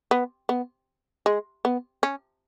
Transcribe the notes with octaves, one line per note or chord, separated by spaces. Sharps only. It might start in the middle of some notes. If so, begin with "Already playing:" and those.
B3
B3
G#3
B3
C#4